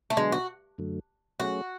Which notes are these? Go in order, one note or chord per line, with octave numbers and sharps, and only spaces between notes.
A3
D3 F#3 G#3 B3 D4
F#4
F#2 D3 F#3 A3
F#3 A3 C#4 F#4 G#4